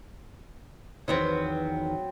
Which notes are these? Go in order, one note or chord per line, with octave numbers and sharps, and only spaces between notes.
E2 D#3 F#3 B3 C4